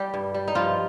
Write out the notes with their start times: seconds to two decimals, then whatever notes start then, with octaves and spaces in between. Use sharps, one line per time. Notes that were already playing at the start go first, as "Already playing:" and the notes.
Already playing: G3 G4
0.14 G2
0.34 G3
0.48 D#4
0.55 G2 F3 F4